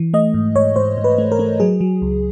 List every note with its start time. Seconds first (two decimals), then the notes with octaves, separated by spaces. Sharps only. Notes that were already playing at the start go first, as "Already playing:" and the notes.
Already playing: E3
0.14 A3 D#5
0.34 G#2
0.56 G#2 C#5
0.76 G#2 C5
0.98 G#2
1.04 B4
1.18 A3
1.32 A#4
1.39 A3
1.60 F#3 G#4
1.81 F#3
2.02 C#2